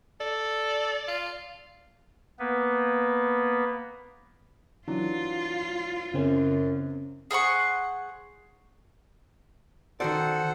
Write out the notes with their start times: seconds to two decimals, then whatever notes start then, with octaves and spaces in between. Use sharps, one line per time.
0.20 A4 D5
1.08 F4
2.39 A#3 B3 B4
4.88 E3 F#3 D4 F4
6.14 F#2 C#3 C4 C#4
7.31 G#4 C5 F#5 C#6
10.00 D#3 F#4 A4 C5 D5 F#5